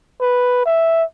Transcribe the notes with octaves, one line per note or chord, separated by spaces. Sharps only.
B4
E5